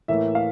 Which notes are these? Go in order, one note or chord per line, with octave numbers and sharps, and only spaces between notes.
A2 E3 A#3 E5
F5